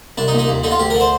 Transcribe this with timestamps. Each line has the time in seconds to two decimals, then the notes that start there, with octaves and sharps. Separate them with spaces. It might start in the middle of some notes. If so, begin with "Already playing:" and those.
0.18 C2 D4
0.28 D#4
0.33 A#2
0.39 D#4
0.48 D#2
0.63 D3 D#4
0.71 F4
0.79 D2 G4
0.90 D3 A#4
1.00 C5